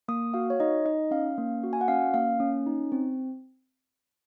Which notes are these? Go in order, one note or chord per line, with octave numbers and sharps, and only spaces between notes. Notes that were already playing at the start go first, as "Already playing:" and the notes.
A#3 D#6
F#4 F5
C#5
D#4 D#5
D#4 D#5
C#4 F5
A#3
F#4
G#5
F#5
C#4 F5
A#3 F5
C#4
D#4
C4